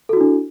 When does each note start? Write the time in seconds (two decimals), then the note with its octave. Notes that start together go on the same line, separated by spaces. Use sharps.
0.09 A4
0.13 F#4
0.17 E4
0.21 D4